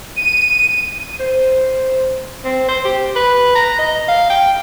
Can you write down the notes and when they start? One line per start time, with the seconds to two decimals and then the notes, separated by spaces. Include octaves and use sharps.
0.16 D#7
1.20 C5
2.45 C4
2.69 C5
2.85 G4
3.16 B4
3.55 A#5
3.79 D#5
4.08 F5
4.30 G5